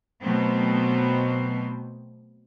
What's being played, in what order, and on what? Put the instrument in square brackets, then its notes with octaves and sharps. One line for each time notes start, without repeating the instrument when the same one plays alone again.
[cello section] B2 F#3 A3 B3 C4